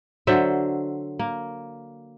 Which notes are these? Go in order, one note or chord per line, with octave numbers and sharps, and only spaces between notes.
D3 F#3 C5 E5
A#3